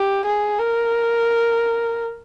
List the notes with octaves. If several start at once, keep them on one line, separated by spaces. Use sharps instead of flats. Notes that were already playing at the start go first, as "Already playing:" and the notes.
Already playing: G4
G#4
A#4